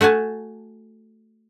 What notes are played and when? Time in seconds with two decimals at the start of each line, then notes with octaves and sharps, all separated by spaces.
0.01 A3 F#4 F#5 G#5 A5